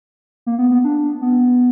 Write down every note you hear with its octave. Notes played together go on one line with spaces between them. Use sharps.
A#3
B3
B3
D4
B3